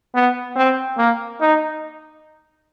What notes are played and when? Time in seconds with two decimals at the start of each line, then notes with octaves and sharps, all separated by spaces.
0.15 B3
0.56 C4
0.98 A#3
1.41 D#4